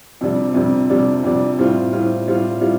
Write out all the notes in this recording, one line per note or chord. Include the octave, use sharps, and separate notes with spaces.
F2 C3 G3 D4
F2 C3 G3 D4
F2 C3 G3 D4
F2 C3 G3 D4
A2 G3 C4 F4
A2 G3 C4 F4
A2 G3 C4 F4
A2 G3 C4 F4